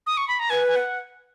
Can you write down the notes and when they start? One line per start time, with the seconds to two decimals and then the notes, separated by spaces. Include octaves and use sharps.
0.07 D#6
0.17 C#6
0.28 B5
0.40 A#5
0.50 B4 G#5
0.68 G#5
0.76 F#5